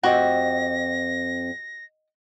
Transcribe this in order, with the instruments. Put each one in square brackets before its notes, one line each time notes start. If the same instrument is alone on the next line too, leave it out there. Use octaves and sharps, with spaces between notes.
[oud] F2 C4 [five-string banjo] F#4 G4 [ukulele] D#5 F#5 G5 [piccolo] A#6